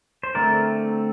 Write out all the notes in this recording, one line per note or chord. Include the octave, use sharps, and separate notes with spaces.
C5
D3 A3 C4 A#4 D5